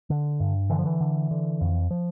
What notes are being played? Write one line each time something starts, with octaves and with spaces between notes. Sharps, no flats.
D3
G2
D3 E3
F3
E3
D3
D3
F2
F3